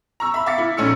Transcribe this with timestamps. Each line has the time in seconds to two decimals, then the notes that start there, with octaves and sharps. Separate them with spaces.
0.20 A#5 C#6 E6
0.34 E5 B5
0.46 E5 F5 D6 A6 B6 C#7
0.58 E4
0.77 A#1 A3 C#4 D#4 E6 C#7